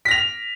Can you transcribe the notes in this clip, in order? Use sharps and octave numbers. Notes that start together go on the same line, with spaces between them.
A#6 B6 F7